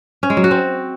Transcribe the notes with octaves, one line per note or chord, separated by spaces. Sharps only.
C#4
G#3
F#3
F#4
C4